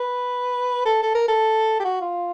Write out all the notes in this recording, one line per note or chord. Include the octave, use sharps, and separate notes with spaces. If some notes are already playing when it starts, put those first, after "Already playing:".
Already playing: B4
A4
A4
A#4
A4
G4
F#4
F4